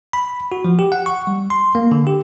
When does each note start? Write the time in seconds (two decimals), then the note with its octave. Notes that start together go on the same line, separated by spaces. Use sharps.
0.13 B5
0.52 F#4
0.65 F3
0.79 G4
0.92 F#5
1.06 C#6
1.27 G3
1.50 C6
1.75 A#3
1.92 D3
2.07 G4